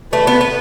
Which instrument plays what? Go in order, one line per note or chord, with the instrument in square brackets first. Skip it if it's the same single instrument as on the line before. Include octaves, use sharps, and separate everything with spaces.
[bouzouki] A3 [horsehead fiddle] B4
[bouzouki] B3
B3